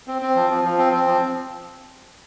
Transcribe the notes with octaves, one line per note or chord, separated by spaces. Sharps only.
C4
C4
F3
F3
F3
C4
C4
F3